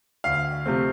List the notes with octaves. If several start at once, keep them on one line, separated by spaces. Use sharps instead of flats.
D2 F5
C3 F3 A3 C4